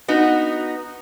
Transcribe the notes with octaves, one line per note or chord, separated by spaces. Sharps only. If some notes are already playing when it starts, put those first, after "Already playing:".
B3 D#4 F#4